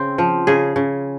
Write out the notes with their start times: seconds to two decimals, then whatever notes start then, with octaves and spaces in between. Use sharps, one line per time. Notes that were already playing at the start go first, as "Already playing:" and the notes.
Already playing: C#3 C4
0.18 F3
0.47 C#3 G#4
0.76 C#3